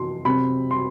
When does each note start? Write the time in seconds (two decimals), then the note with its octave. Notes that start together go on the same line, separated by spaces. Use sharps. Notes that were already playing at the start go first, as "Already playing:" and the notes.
Already playing: C3 E3 C6
0.25 C3 F#3 C4 B5
0.71 C6